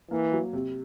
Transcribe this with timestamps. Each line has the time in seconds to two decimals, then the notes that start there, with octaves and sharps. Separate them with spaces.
0.11 E3 A#3
0.33 F#3
0.53 C3